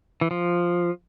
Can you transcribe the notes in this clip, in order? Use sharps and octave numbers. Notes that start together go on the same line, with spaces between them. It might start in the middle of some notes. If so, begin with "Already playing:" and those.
E3
F3